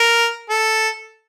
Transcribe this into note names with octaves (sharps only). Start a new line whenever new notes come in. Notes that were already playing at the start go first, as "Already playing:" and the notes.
Already playing: A#4
A4